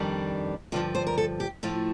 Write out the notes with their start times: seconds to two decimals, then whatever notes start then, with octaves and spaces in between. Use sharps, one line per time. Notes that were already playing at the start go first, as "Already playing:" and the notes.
Already playing: F2 D#3 G3 D4
0.72 G2 D3 F3 F4
0.95 C5
1.07 A#4
1.18 A4
1.40 G4
1.63 A2 F3 A3 F4